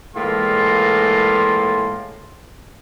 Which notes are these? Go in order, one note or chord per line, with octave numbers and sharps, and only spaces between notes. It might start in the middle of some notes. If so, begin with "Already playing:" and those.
A2 E3 G#3 A#3 F4 C6